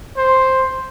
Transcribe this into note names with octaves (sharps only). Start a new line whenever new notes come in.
C5